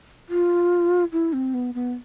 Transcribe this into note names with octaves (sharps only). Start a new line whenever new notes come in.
F4
E4
C4
B3
B3